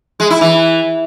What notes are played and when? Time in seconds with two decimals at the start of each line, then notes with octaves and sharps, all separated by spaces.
0.20 G#3
0.30 E4
0.41 E3